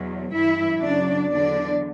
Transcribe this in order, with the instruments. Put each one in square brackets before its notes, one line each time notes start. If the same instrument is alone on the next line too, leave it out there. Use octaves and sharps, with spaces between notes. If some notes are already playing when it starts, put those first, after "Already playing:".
Already playing: [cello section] E2 B2 F#3
G2 E3 E4 E5
F#2 C#3 F#3 D4 D5
E2 D3 F#3 D4 D5